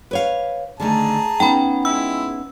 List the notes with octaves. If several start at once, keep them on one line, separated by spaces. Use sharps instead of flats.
B4 C#5 F5
D3 D#3 A3 G#4 A5 A#5
B3 C#4 D#4 G5 B5
G#3 E4 E6